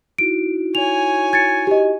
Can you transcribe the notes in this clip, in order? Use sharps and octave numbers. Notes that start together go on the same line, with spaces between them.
D#4 E4 F#4 D7
C#5 G#5 F7
G#6 A6 C#7
G4 D#5